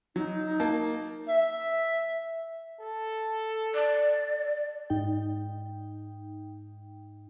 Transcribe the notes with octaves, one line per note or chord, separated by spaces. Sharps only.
F#3 D#4
A#3 A5
E5
A4
D5
G#2 D#4 G5